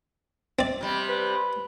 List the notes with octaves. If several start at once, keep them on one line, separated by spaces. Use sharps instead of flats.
C4 D5
C3 G3
B4